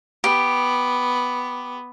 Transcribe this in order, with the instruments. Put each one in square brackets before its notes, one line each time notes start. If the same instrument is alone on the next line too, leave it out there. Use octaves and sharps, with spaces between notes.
[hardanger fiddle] B3 [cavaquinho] G4